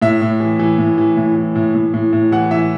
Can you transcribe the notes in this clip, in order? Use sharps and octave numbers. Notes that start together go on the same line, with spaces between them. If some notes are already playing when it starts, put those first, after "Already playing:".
A2 E5
A2
E3
E3
A2
E3
A2
E3
A2
A2
A2
A2
E3 F#5
E3 E5